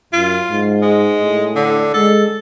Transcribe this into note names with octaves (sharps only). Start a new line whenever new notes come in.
F#2 F4
G#2
G#3
A2
D3
G#3 A4